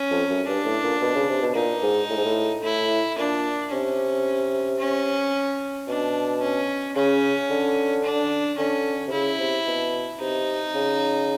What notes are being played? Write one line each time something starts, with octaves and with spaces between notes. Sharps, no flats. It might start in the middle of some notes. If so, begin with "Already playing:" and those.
Already playing: C#4
F2
F#2
G2 D4
A2
A#2
B2
C#3
C3
B2
A#2 D#4
G#2
A2
G#2
A2
A2 E4
A#2 D4
C3 C#4
C#4
B2 D4
C#4
C#3 C#4
D3
D4
D3 C#4
C3
C#3 E4
C3
B2
C3 D#4
C#3